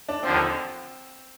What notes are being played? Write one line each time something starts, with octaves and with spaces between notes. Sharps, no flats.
D4
D#2 D3 F3 C4